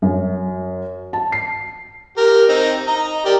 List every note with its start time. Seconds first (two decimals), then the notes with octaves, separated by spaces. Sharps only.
0.02 F#2
1.13 A5
1.32 C7
2.17 G4 A#4
2.49 C4 D#4
2.88 D#5 A#5
3.26 G4 A#4 D5